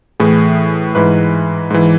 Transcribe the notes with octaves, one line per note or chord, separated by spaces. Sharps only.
A2 E3 G#4
G#2 E3 B4
G#2 E3